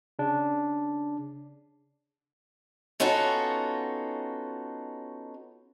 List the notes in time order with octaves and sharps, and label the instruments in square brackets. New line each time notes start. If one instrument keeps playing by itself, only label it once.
[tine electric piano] C#3 D4
[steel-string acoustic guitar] B3 C#4 D#4 F4 F#4 A4